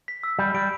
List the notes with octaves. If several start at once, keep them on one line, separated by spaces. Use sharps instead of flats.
B6
E6
G3 B5
G3 D7